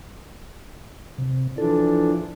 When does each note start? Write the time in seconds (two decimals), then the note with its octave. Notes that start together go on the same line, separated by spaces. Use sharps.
1.18 C3
1.58 E3 F3 D4 A4